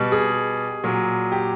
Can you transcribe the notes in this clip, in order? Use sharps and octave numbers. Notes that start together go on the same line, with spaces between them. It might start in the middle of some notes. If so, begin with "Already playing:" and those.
Already playing: B2 G3
G#4
A#2 F#3
G4